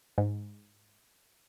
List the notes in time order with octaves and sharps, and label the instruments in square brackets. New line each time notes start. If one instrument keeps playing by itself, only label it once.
[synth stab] G#2